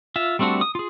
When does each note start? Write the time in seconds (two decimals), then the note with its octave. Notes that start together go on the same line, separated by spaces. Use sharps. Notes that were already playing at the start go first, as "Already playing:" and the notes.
0.16 F4 E5
0.39 G3 A3 C4 D4 F#4
0.61 D#6
0.75 F4 G#4